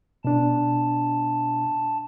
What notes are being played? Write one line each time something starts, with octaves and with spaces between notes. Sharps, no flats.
B2 D4 A5